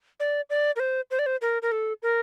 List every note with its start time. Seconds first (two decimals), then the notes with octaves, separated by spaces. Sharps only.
0.20 D5
0.50 D5
0.76 A#4
0.80 C5
1.11 C5
1.19 D5
1.26 C5
1.42 A#4
1.62 A#4
1.72 A4
2.03 A#4